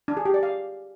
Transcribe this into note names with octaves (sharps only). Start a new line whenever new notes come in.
D4
G#4
G4
D5
F5